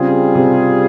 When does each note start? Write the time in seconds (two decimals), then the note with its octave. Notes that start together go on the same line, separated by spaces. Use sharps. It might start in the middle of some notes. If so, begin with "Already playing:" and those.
Already playing: C#3 G3 C4 F4 G#4
0.35 C3